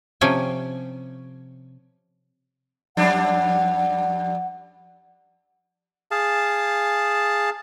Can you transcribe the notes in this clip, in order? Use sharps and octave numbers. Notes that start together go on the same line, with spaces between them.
C3 F3 C#4 G5 G#5
F2 G3 D4 F#5
G#4 F5 A5